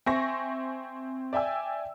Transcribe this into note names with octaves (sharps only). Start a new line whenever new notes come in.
C4 E5 G#5 C#6 A#6
D5 E5 G5 G#5 E6